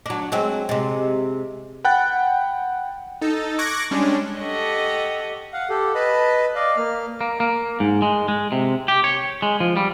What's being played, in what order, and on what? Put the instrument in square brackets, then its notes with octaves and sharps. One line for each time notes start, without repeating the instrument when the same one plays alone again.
[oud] F#3 D4
F#3 G#3 C4
C3 G#3
[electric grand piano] F#5 G5 B5 F#6 A6
[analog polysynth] D#4 A4
C#6 D6 F#6 G#6 A#6
G3 G#3 C#4 D4
[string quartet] G4 A4 D#5 F#5 C#6
[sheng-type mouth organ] F5 F#5
G4 A4
B4 D#5 A5 B5
D5 D#5 F5
A#3 F6
[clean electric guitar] A#3
A#3
G#2
G#3
G#3
C3
G4
C#5
G#3
F3
G3